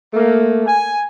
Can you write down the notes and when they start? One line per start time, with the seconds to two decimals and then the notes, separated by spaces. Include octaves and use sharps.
0.14 A3 A#3
0.66 G#5